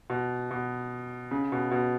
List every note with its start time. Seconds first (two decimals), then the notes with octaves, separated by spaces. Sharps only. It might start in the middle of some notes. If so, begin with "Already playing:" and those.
0.10 B2
0.51 B2
1.31 C#3
1.52 B2
1.71 B2